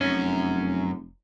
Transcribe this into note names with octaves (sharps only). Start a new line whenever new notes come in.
F1 F#2 C#4